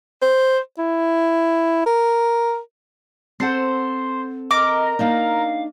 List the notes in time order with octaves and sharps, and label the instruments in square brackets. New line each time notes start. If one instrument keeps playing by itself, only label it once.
[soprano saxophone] C5
E4
A#4
[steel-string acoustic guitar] C4 A4 F#5 [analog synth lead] C5
[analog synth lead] A#4 [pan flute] D#5 [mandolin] D6
[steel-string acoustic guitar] A#3 D4 D#4 [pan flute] F5